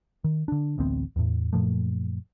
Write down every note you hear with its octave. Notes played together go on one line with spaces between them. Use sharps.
D#3
D3 D4
A1 D2 B3 C4
E2 A2
F#2 A#2 F3 A3